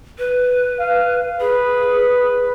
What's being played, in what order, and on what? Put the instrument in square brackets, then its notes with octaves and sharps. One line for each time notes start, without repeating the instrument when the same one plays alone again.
[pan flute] B4
[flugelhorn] F5
[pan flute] G#4 [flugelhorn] B4